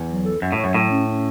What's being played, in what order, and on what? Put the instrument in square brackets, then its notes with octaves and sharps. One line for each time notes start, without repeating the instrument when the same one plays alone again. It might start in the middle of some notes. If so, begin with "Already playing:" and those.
Already playing: [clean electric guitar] E2
[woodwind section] F#3
A4
[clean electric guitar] F#2 [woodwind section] F#3
[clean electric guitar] A2
[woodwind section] C#5
[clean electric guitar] F#2
[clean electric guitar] A2 [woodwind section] F#3
[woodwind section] C#4
C#4